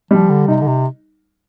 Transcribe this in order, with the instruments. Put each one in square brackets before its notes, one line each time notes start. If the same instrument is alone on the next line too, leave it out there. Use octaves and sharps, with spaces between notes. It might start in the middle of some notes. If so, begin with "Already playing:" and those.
[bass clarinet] F3 [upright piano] G3
[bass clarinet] D3
[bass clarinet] C3 [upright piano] D#4
[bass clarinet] D3
C3